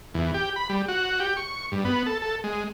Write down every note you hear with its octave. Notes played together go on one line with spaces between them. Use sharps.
E2
G4
B5
G3
F#4
G4
C#6
G2
B3
A4
A4
G#3